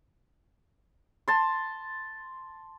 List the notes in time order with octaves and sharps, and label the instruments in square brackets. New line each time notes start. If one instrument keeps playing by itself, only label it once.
[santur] A5 C6